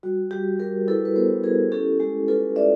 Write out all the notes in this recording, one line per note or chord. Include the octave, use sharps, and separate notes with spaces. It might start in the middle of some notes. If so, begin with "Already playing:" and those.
G3 F#4
G3 G4
G3 G#4 A#4
E4 A4 B4
B4
B3 A#4 C5
E4 G#4 A#4
C#4 G4 A4
G#3 G4
F4 A4 B4
F4 D5 E5